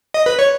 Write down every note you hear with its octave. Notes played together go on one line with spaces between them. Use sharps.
D#5
B4
C#5